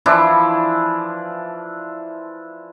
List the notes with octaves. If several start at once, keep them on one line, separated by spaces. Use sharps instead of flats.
E3 F3 D4 E4